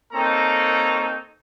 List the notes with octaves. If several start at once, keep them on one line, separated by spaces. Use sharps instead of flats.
A#3 C4 D#4 A4 C#5 A#5